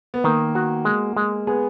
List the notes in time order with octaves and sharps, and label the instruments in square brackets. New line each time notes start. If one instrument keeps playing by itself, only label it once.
[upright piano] B3
[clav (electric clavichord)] D#3 [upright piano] A#3
[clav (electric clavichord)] F#4
G#3
G#3
[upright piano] B3 [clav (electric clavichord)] G#4